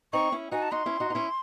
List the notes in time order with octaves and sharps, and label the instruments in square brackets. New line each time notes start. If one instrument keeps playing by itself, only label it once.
[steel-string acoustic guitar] C4 D#4 [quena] C#6
[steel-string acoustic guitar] C#4 E4
[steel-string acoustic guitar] D#4 F#4 [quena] G#5
[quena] A5
[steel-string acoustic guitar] D#4 F#4 [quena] C6
[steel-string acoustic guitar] C#4 E4
D#4 F#4
D#4
C#4 E4